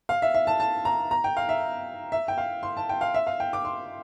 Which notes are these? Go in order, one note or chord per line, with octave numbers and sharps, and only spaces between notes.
F5
E5
E5
A5
A5
A#5
A#5
G5
F5
E5
E5
G5
F5
C6
A5
G5
F5
E5
F5
G5
D6
C6